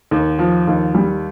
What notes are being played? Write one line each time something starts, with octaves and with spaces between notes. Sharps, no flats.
D#2
F3
D#2
G3